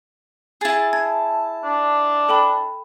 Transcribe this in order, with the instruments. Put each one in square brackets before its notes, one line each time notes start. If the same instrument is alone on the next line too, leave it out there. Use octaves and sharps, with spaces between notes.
[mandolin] E4 G#4 [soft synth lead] A6
[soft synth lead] A5 [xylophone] G#6
[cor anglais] D4
[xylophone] A4 G5 B5